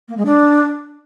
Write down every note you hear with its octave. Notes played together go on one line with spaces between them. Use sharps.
A#3
G#3
D4